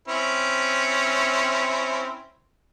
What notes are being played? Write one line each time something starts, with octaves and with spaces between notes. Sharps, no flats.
C4 C#4 E4